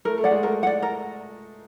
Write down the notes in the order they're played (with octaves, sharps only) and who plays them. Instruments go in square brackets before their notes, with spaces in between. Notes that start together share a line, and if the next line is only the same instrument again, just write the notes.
[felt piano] A3 [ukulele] A#4
[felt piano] A3
[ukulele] D5 F#5
[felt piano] G#3
[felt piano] A3 [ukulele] A#4
[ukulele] D5 F#5
A#4